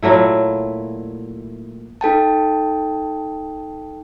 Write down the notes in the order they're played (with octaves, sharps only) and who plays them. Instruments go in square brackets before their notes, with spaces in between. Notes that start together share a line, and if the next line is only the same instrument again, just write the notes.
[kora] A#2 F#3 A3 E4
[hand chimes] D#4 A4 G5 A5